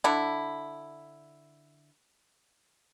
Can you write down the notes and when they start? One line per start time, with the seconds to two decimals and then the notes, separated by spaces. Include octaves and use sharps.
0.04 D3 E4